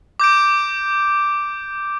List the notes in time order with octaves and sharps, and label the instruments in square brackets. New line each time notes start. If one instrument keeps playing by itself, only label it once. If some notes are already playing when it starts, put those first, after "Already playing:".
[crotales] D6 G6 D7